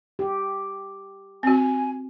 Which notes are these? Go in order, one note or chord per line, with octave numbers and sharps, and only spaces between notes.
G4
C4 F#4 G#5